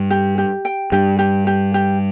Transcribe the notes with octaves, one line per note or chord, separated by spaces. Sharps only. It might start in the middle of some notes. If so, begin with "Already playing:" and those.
Already playing: G2
G4
G4
G5
G2 G4
G4
G4
G4